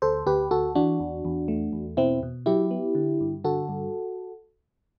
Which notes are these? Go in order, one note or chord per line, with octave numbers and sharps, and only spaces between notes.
D2 A4 C5
D2 G4 B4
D2 F#4 A4
E3 D4 F#4
E2
E2
A3
E2
B2 C4 E4
B2
F#3 E4 G4
B3
D3
G2
D3 F#4 A4
G2